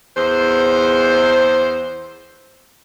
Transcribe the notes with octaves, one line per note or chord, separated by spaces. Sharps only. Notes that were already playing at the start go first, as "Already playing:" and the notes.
E2 C5